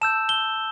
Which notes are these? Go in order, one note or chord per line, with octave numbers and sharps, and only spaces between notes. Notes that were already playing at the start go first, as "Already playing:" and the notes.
A5 E6 G6 E7
G7